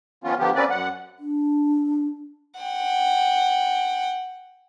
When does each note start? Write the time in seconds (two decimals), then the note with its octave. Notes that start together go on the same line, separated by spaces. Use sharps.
0.24 D#3 F3 B3 C#4 F4
0.39 D3 D#3 F3 B3 G4
0.55 A#3 C4 C#4 B4 D5
0.70 F#2 F#5
1.19 D4
2.60 F#5 G5